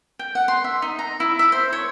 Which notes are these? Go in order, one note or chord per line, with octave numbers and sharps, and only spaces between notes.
G5
F#5
C6
E5
D#4
A#5
E4
E5
C5
C#5